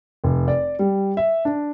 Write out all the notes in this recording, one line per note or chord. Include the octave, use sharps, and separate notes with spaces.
F1
D5
G3
E5
D4